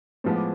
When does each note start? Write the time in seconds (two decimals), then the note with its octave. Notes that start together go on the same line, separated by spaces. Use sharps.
0.24 A2 F3 G#3 B3
0.36 D6